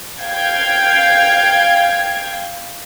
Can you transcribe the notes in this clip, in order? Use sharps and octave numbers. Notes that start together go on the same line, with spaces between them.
F5 G5 G#6